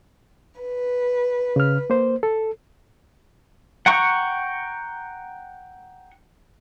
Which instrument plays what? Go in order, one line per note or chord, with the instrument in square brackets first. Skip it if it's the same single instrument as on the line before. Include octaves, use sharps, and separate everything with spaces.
[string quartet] B4
[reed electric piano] C#3 F6
A#3 C5
A4
[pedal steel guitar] F#5 G5 A#5 C#6